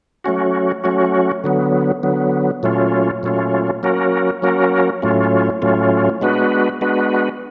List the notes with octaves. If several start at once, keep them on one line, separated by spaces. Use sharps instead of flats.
F#3 A3 C#4 F#4
F#3 A3 C#4 F#4
D3 F#3 B3
D3 F#3 B3
A#2 F#3 A3 C#4 F4
A#2 F#3 A3 C#4 F4
F#3 A#3 C#4 F#4 A#4
F#3 A#3 C#4 F#4 A#4
A2 F#3 A3 C#4 F4
A2 F#3 A3 C#4 F4
G#3 B3 D4 F#4 B4
G#3 B3 D4 F#4 B4